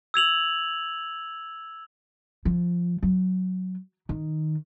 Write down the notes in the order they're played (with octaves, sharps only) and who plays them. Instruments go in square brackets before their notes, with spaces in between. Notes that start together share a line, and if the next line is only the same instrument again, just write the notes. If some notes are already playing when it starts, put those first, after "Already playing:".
[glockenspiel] E6 G#6 F7 F#7
[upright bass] F3
F#3
D#3